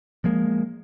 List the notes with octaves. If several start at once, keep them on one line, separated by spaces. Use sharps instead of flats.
F3 G#3 A#3